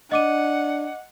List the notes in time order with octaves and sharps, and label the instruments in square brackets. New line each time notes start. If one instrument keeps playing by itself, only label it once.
[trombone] D4 [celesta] D#5 D6 D#7 [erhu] F#5